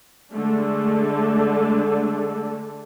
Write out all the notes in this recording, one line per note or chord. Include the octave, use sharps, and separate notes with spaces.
D3 G#3 A3 D4 A4